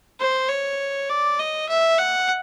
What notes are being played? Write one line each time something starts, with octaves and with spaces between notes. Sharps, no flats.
C5
C#5
D5
D#5
E5
F#5